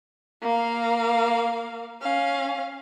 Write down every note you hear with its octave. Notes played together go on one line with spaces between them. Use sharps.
A#3 F5
C#4 F5